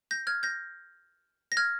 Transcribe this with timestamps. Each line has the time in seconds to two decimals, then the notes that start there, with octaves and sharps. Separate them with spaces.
0.11 G6 A#6
0.27 F6 G#6
0.43 G6 A#6
1.52 A#6
1.57 F6 G#6